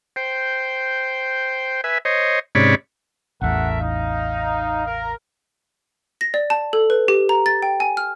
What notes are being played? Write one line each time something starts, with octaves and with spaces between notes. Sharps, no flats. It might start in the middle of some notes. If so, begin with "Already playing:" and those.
C5 G5
B4 E5 G#5
C5 C#5 D#5
G#2 C3 C#4 C#5 D5 B5
A1 E2 A3 A#4 E5 F#5
D#4 F5
A#4
A#6
D5
A5
A4
B4
G4
A#5
A6
G5
G#5
F6